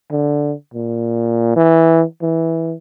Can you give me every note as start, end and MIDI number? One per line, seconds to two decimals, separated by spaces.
0.11 0.54 50
0.74 1.52 46
1.56 2.04 52
2.22 2.75 52